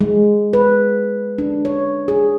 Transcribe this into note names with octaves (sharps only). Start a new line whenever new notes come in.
G#3
B4
D4
C#5
G#4